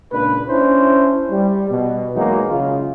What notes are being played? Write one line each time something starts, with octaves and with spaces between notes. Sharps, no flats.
C#2 A#2 D4 B4
C#4 D4 E4 C5
G3
B2
E3 F#3 G#3 A#3 D#4
C#3 F4